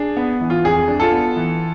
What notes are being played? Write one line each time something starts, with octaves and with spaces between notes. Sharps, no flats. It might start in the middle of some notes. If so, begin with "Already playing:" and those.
Already playing: D4 G#4
B3
E3
F4
F2 G#4
D4
F4 A4
B3
E3